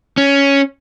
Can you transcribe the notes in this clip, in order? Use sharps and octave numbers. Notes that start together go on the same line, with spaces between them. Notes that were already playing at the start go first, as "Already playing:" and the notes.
C#4